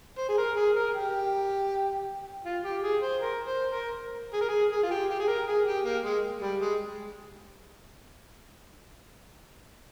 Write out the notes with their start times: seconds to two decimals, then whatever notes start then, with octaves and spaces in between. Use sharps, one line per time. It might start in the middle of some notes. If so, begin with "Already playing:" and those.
0.18 C5
0.29 G#4
0.38 A#4
0.56 G#4
0.75 A#4
0.94 G4
2.45 F4
2.64 G4
2.83 G#4
3.01 C5
3.21 A#4
3.46 C5
3.71 A#4
4.34 G#4
4.41 A#4
4.49 G#4
4.71 G#4
4.83 F4
4.91 G4
5.10 G4
5.20 G#4
5.28 A#4
5.47 G#4
5.66 G4
5.84 A#3
6.04 G#3
6.41 G3
6.60 G#3